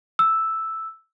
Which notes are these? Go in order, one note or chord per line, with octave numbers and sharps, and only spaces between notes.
E6